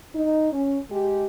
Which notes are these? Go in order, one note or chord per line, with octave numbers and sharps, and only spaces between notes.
D#4
C#4
G#3 G4